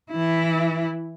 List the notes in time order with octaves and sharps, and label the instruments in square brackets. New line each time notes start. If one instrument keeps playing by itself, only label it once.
[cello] E3 E4